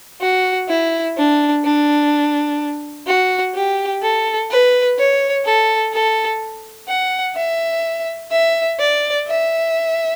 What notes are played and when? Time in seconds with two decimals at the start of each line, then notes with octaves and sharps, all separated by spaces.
0.21 F#4
0.69 E4
1.17 D4
1.64 D4
3.07 F#4
3.54 G4
4.03 A4
4.51 B4
4.98 C#5
5.45 A4
5.93 A4
6.88 F#5
7.36 E5
8.31 E5
8.79 D5
9.27 E5